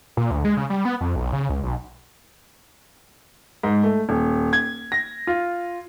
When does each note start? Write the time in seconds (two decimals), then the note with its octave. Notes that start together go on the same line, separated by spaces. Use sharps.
0.17 A#2
0.31 D2
0.45 G#3
0.57 C#3
0.70 G3
0.85 B3
1.01 F2
1.16 B1
1.33 C#3
1.49 C#2
1.63 B1
3.63 G#2
3.83 A3
4.09 D#1
4.53 G#6
4.92 A#6
5.27 F4